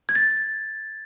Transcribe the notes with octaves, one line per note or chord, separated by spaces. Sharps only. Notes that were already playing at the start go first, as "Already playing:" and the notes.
G#6
A6